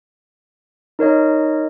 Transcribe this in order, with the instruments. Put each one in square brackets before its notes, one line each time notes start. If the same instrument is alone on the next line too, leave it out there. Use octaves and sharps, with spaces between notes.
[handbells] D#4 A#4 C#5 D#5